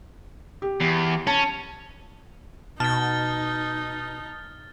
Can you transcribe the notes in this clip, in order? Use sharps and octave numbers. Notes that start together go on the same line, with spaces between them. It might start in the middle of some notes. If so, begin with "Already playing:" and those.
G4
E2
C#4 A5
B2 D#4 A5 F6 A6